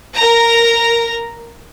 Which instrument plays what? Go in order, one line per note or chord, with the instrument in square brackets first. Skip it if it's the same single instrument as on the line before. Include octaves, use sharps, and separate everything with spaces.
[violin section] A#4 A#5